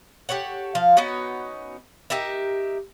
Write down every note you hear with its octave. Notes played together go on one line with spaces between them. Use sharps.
G4 A4 C#5 F#5
F3 F5
B3 C#4 D#4 F#4
D#4 G4 A#4 E5